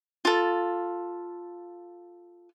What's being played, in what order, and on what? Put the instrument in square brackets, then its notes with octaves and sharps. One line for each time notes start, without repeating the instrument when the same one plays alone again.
[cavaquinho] F4 A4